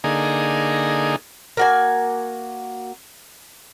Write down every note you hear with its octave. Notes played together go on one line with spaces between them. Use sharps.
D3 A#3 D#4 G#4
A#3 F#4 G#5